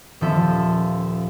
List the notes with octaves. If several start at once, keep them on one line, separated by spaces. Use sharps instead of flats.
D#1 F3 C#4 A4 E5